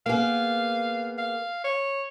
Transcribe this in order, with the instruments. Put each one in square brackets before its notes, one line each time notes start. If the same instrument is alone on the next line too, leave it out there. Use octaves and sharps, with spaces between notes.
[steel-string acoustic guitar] A#3 B3 G#4 [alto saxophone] F5
[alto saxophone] F5
C#5